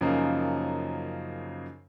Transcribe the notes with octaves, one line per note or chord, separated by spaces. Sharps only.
F#2 C#3 F3 A#3 D#4